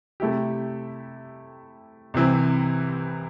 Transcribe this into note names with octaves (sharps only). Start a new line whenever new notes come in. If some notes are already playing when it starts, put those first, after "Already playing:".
C3 A3 E4 G4
C2 C3 E3 C4